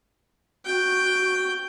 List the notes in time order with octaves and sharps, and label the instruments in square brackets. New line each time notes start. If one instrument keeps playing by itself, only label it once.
[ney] F#4 [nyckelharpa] G5